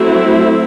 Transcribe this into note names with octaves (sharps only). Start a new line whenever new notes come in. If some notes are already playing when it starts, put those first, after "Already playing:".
Already playing: F#3 A3 C4 E4